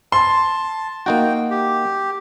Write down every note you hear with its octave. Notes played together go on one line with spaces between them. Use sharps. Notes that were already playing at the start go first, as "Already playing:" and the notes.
A5 C6
A#3 D#4 F#4 G5
G4